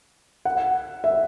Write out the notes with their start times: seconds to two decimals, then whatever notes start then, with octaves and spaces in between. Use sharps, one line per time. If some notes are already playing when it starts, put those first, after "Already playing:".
0.45 F#5
1.04 E5